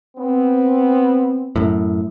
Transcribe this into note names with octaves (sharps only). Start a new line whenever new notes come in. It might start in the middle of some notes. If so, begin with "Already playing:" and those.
B3 C4
F#2 A2